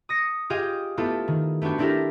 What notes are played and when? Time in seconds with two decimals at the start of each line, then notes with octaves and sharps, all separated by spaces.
0.09 D#6 A#6 C#7
0.50 F4 G4 G#4 D#5 F5 G5
0.97 A3 B3 E4 F4 G4 A4
1.28 D#3
1.62 A3 B3 D4 F#4 G5
1.78 C4 D4 E4 G4 A4 A#4